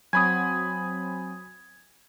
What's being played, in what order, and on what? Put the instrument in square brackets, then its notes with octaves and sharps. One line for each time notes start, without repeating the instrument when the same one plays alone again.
[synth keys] F#3 C4 [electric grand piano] G#5 B5 D#6 [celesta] G#6